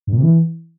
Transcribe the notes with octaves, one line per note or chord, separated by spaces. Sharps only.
G2
A#2
C3
E3